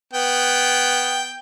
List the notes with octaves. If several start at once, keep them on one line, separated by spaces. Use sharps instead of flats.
B3 G5